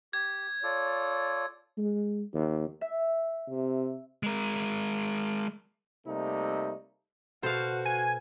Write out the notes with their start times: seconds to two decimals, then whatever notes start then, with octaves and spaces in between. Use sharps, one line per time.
0.13 G4 G#6
0.63 F4 A4 C#5 D5
1.78 G#3
2.34 D#2
2.81 E5
3.50 C3
4.23 G#3 A#4
6.06 C3 G3 A3 A#3 D#4
7.43 B2 F#4 A4 C5 F5
7.85 G#5